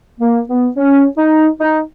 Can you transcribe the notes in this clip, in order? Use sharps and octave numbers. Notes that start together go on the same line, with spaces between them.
A#3
B3
C#4
D#4
D#4